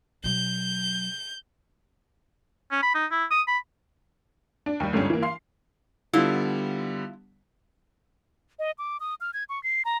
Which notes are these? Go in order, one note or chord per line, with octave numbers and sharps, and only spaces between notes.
B2 F#3 G6
C#4
B5
D#4
E4
D#6
B5
D4
D#2 G3
G1 G#2 D3 G3 C#4
E3 A#3
F5 C6 C7
D3 G3 B3 E4 F4
D#5
D6
D#6
F6
G#6
C#6
C7
A#5